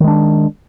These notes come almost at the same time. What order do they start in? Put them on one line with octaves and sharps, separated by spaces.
D#3 G#3 D4